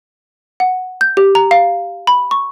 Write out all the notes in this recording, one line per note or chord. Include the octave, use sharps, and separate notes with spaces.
F#5
G6
G4
A#5
F5
B5
C#6